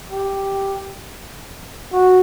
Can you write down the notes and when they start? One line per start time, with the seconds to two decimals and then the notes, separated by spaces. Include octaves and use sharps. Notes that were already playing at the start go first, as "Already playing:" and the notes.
0.10 G4
1.93 F#4